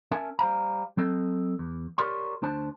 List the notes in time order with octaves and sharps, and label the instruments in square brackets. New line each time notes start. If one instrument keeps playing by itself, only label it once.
[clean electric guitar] C#4 A#4 E5 G#5 A5
G3 C5 F5 A#5
F#3 C4 A4 D#5
E2
G4 A#4 C#5 D5 C6
D2 D4 C5 A5